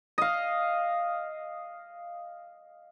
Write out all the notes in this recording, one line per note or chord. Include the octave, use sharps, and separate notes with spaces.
D#5 F5